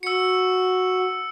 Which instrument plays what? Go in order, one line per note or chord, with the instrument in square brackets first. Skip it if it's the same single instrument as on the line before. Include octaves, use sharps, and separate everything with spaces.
[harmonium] F#4 [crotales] E6 C#7